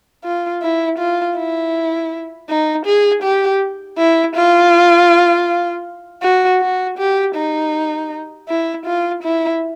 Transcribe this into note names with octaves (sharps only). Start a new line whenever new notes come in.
F4
E4
F4
E4
D#4
G#4
G4
E4
F4
F#4
F#4
G4
D#4
E4
F4
E4